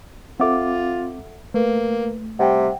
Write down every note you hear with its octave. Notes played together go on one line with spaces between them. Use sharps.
C4 F4 A4 E5 F#5 D6
A3 A#3 B4
C3 G3 F#5 G5